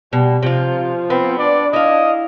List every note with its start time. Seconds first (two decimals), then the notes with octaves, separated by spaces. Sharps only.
0.13 B2 G3
0.43 C3 F3 F4
1.10 B3 C4
1.39 D4 D5
1.73 E4 D#5 F5